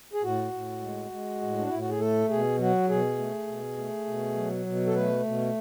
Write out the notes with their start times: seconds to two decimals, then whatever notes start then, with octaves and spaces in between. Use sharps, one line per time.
0.13 G#4
0.23 A2 F#4
0.52 A2
0.82 G#3
1.11 G#3
1.41 A2
1.58 D4
1.68 A2 E4
1.79 F#4
1.89 G#4
1.99 A3 A4
2.30 B2 G#4
2.59 F#3 F#4
2.89 B2 G#4
3.18 A3
3.47 B2
3.77 A3
4.07 B2
4.36 F#3
4.66 B2
4.87 A4
4.95 A3 B4
5.25 B2